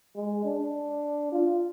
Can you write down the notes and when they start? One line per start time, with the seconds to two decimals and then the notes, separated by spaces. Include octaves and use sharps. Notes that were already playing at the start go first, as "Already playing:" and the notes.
0.15 G#3
0.44 D4
1.32 F4